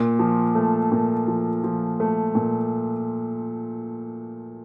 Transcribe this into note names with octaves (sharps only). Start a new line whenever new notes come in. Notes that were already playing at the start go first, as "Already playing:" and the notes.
Already playing: A#2
F3
A3
A#2
F3
F3
A3
A#2